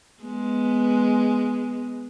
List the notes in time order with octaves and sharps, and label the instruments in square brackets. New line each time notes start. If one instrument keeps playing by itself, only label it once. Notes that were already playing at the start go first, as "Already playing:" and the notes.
[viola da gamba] G#3 B3